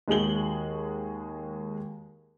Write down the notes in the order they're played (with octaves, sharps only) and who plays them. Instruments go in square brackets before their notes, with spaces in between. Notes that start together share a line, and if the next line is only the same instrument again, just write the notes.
[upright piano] D#2 G#3 F#4 G#4 F#7 G7